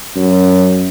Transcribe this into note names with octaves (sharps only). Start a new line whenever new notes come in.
F#2